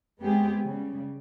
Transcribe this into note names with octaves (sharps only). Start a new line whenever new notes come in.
G#3 B3 C4 G4 G#4
C#3 G3